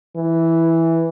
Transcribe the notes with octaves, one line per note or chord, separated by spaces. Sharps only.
E3